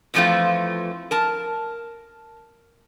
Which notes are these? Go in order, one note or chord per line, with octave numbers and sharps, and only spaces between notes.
F2 E3 F3 A3 C4 F4
A#4 A5